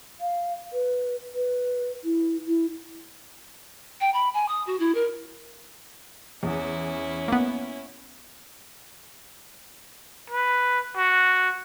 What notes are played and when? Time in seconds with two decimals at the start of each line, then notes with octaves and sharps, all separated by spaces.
0.21 F5
0.73 B4
1.35 B4
2.04 E4
2.47 E4
4.01 G5
4.14 B5
4.34 G#5
4.48 D#6
4.67 F#4
4.79 E4
4.95 A#4
6.43 E2 C#4 E4
7.28 A#3 B3
10.30 B4
10.97 F#4